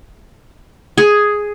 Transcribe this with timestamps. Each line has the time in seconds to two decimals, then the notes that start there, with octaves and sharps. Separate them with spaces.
0.98 G#4